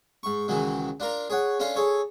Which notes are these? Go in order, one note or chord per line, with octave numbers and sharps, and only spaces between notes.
G#2 C#6
C#2 D#3 E3 F#3 G#3
D4 F4 A#4 A#5
G#4 C#5 F#5
C#4 D4 F4 A4 C6
G#4 A4 C#5